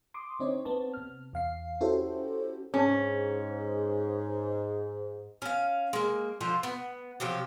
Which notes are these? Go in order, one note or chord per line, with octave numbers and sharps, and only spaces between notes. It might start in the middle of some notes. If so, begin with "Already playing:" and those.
C6 D6 D#6
D3 C4 D#4 C#5
B3 C4 A5
C3 F6
E2 F5 C7
C#4 E4 F#4 G4 A4 C5
G#2 C#4
C#4 F5
G#3 A#3
D3 F3 F4 C5
B3
C3 F3 F#3 G4